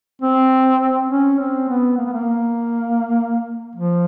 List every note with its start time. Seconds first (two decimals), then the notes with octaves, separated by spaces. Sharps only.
0.22 C4
1.10 C#4
1.39 C4
1.69 B3
1.98 A#3
2.06 B3
2.13 A#3
3.75 F3